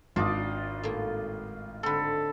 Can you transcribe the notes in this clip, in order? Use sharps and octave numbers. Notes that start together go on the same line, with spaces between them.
G#1 D4 F4 D5 D#5
A2 A#3
D3 C4 A4 B5